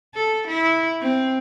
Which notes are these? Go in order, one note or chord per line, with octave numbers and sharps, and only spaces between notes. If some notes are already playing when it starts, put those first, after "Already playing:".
A4
E4
C4